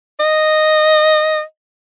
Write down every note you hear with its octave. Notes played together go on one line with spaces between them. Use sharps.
D#5